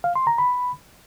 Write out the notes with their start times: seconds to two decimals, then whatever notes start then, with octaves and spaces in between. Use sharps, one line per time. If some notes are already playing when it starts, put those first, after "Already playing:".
0.04 F5
0.15 C6
0.27 A#5
0.38 B5